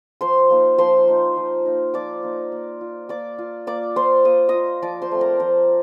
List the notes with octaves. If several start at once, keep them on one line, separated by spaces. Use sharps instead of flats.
F3 C5 C6
A#3 D#4
F3 C5 C6
A#3 D#4
F3
A#3 D#4
F3 D5 D6
A#3 D#4
A#3
F4
A#3 D5 D6
F4
A#3 D5 D6
F4 C5 C6
A#3 D#6
F4 D#5 D#6
F3 D5 D6
C5 C6
A3 C4
A#4 A#5
F3 C5 C6